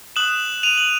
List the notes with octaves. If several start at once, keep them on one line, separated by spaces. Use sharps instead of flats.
D#6 F#6 E7 F#7
D#7 F7
F#7